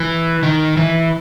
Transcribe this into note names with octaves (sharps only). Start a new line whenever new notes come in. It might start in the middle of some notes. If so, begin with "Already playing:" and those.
Already playing: E3
D#3
E3